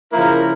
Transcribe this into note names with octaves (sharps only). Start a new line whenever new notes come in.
C#3 F3 A#3 E4 A#4